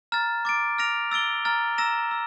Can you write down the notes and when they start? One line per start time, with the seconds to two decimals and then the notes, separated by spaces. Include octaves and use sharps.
0.12 A#5 F6 A6
0.45 D6 A6 D7
0.78 F6 A#6 D7 F7
1.11 E6 A6 D7 G7
1.45 A#5 F6 A6
1.78 A#5 E6 A#6 E7
2.11 E6